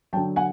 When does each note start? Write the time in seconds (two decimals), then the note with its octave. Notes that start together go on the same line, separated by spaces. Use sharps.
0.13 F#3 G5 A5
0.17 D3
0.36 F#5 G#5